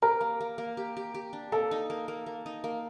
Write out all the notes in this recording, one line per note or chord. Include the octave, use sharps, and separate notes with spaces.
G4 A#4
A#3
A#3
A#3
G4
G4
G4
D4
A#3 A4
D#4
A#3
A#3
A#3
D#4
A#3